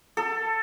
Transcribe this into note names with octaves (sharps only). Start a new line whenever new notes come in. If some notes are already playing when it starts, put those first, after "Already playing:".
A4